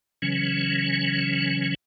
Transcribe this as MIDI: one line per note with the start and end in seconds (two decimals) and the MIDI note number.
0.22 1.75 49
0.22 1.75 52
0.22 1.75 54
0.22 1.75 61